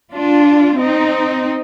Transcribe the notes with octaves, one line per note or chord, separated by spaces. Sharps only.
D4 F4
C4 D#4